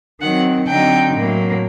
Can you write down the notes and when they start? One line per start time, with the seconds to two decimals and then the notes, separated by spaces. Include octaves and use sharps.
0.20 D#3 F#3 C4 F#5
0.67 D3 F#3 C4 D#4 G5
1.14 A2 F#3 A#3